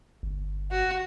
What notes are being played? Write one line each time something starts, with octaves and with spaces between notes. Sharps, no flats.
G1
F#4